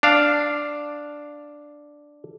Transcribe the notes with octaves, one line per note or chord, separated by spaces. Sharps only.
D4 F5